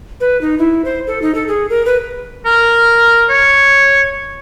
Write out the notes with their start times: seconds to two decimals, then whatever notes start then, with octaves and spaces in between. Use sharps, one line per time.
0.20 B4
0.41 D#4
0.58 E4
0.85 C5
1.07 A4
1.22 D#4
1.35 A4
1.48 G#4
1.70 A#4
1.86 B4
2.46 A#4
3.30 C#5